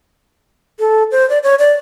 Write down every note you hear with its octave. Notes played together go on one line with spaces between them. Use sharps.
A4
C5
D5
C#5
D5